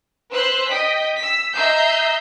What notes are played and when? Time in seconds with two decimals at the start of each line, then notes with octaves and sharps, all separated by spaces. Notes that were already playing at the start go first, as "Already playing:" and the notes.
0.33 B4 C5 C6 E6 F#6
0.69 D#5 G5 B6
1.18 E6 B6
1.55 D#5 E5 A#5 E6 G6 C7